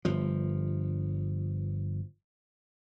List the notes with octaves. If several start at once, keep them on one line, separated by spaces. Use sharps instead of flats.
G1 F3